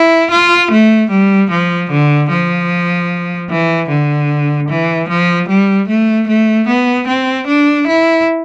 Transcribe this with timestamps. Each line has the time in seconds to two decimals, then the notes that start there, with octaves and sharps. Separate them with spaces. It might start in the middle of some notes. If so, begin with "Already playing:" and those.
Already playing: E4
0.31 F4
0.71 A3
1.11 G3
1.51 F3
1.90 D3
2.30 F3
3.49 E3
3.89 D3
4.69 E3
5.09 F3
5.49 G3
5.88 A3
6.28 A3
6.68 B3
7.07 C4
7.47 D4
7.87 E4